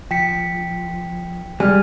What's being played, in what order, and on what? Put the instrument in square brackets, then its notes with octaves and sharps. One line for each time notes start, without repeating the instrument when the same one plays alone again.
[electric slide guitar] F3 [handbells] G5 B6 C#7
[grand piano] G3 [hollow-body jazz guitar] G#3 [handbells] G#5 F6